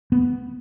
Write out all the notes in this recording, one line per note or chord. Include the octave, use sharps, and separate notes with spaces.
B3